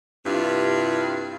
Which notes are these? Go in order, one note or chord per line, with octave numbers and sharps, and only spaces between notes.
G2 C3 E4 F4